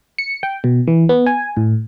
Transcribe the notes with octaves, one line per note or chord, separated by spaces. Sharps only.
C#7
G5
B2
E3
B3
G#5
A2